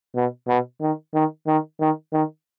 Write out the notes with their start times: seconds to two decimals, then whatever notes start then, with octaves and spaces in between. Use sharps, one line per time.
0.16 B2
0.48 B2
0.81 D#3
1.14 D#3
1.47 D#3
1.80 D#3
2.13 D#3